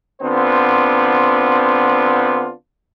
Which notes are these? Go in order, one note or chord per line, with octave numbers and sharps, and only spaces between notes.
D3 B3 C4 D4 F4 C5